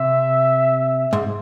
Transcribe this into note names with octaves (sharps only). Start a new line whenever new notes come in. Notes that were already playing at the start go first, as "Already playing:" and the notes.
Already playing: C3 E5
G#2